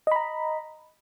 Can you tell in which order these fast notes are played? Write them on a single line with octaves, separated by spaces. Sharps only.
D#5 B5 A#5